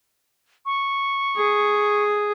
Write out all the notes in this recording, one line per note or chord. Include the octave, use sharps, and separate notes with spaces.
C#6
G#4